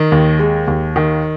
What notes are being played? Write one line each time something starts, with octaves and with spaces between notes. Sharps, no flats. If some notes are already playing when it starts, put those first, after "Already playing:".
Already playing: D#3
D#2
G#3
D#2
D#3